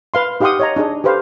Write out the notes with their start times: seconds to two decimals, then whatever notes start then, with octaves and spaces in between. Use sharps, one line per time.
0.14 B4 F5 C6
0.40 D#4 G4 F5 F#5 C6 D#6
0.60 C#5 D#5 A#5
0.76 D4 D#4 G#4
1.04 G4 A4 B4 C5 F5